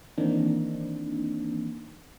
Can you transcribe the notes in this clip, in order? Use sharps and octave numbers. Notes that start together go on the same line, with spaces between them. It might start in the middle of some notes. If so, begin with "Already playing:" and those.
D#3 E3 A#3 C4 D4 D#4